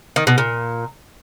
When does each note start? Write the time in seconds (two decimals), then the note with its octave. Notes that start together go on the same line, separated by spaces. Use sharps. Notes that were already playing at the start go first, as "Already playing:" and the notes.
0.16 D#3
0.27 B2
0.38 A#2